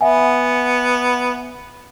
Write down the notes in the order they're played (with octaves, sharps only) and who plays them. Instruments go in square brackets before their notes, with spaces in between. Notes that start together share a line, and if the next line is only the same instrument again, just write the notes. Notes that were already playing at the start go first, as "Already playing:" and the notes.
[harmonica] B3 [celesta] E5 F#5 G#5